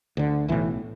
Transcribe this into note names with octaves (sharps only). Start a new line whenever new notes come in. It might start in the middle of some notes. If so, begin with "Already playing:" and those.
D2 D3
B1 A2 E3